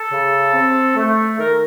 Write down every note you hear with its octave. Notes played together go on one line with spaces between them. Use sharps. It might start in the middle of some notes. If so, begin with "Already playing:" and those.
Already playing: A4
C#3
C4
A3
D#3 A#4